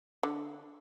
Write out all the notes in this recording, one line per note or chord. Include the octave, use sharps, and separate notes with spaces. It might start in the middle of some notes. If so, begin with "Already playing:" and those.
D3